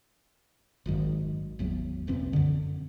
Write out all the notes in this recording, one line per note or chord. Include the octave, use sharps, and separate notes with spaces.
G#1 F#2 D#3
G#1 E2 F#3
F#1 B1 E3 C4
F#2 D3